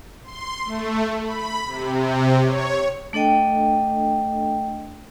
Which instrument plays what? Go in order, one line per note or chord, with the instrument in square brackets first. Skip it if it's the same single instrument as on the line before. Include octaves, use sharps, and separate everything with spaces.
[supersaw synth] C6
A3
B5
C3
C#5
[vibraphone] A3 D4 A4 D#5 G5